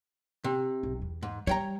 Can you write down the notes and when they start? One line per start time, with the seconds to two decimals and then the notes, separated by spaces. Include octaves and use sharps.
0.44 C3
0.83 E1 B1
1.02 E2
1.23 G#2
1.47 G3 C#5 G5 A#5